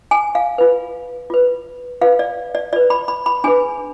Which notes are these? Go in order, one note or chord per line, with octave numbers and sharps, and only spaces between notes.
G#5
F5
F4 B4
F4 B4
F4 B4 F5
D5
D5
F4 B4 D5
B5
B5
B5
D4 G#4 B4 G#5